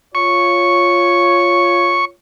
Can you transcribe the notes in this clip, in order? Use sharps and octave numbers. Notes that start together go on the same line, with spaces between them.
F4 C#5 C#6